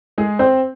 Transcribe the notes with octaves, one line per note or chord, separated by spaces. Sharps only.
G#3 G#4
C4 C5